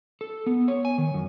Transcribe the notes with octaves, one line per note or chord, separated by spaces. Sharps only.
A4
B3
C#5
G#5
D#3
F#2